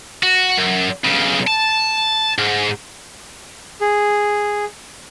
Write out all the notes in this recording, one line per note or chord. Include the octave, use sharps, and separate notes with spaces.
F#4
F#2
B1 C#3
A5
G#2
G#4